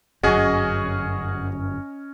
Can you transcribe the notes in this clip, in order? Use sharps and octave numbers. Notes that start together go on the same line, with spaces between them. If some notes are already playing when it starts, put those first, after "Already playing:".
G1 F#2 C#4 F#4 G#4 D#5